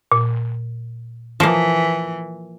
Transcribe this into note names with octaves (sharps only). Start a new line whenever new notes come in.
A#2
E3 F3 A#3